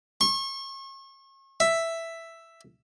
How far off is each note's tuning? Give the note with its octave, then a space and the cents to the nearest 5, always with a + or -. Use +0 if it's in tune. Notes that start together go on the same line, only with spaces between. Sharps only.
C#6 -40
E5 +5